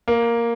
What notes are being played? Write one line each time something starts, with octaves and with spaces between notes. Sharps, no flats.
A#3